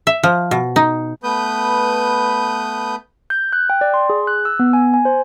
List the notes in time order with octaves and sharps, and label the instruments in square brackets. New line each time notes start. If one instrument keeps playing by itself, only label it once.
[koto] E5
F3
B2
D#4
[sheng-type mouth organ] A3 B3 B4 D#6 G6
[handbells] G6
F#6
G5
D5
C6
G#4
F#6
E6
B3
G#5
G#5
C5